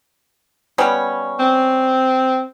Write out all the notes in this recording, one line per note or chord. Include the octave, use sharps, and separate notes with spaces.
G3 B3 C#4
C4